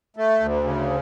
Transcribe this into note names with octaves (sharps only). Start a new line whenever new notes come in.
A3
D2
C#3